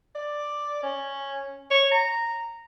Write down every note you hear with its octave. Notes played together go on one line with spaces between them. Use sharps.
D5
C#4
C#5
A#5